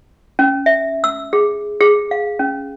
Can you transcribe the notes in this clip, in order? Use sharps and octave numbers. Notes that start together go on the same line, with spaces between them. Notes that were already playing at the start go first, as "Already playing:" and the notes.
C#4
E5
E6
G#4
G#4
F5
C#4